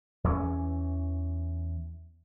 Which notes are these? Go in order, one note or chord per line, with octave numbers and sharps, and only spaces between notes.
E2 E3 F#3 C#4